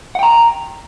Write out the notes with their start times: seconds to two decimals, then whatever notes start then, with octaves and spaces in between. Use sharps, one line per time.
0.15 F#5
0.19 G5
0.23 A#5